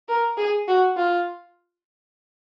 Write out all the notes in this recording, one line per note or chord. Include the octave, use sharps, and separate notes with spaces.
A#4
G#4
F#4
F4